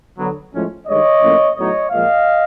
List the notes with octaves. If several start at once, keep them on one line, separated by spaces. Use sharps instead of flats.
D3 F#3 B3
A2 F3 G#3 C#4
G2 D#3 G#3 C#5 D#5
A2 F3 A#3 C#4
A2 F#3 B3 D#4 C#5 D#5
A#2 F3 G#3 D#5 F5